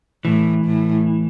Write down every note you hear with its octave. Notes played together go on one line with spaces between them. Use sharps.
A2 E3
A2